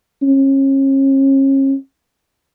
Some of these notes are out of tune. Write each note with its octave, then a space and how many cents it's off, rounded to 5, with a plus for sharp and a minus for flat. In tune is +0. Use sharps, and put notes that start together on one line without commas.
C#4 -35